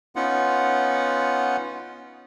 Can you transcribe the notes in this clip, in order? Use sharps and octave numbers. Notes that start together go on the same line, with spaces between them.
B3 C#4 D#4 F4 F#5